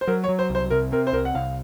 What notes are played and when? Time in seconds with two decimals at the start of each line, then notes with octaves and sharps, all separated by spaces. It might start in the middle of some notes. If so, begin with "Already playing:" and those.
0.01 C5
0.08 F#3 A#4
0.24 C#5
0.29 F#3
0.39 C5
0.50 C2 C5
0.70 C3 A#4
0.92 C4 A#4
1.07 C5
1.13 C2 A#4
1.25 F#5
1.35 C2 F5